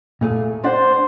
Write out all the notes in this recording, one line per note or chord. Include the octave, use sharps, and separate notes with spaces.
A#2 A3 G#4
D4 C5 D5 F#5